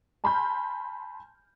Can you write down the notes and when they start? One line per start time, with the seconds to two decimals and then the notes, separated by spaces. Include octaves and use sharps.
0.24 G#5 A5 B5 C6 F6 G6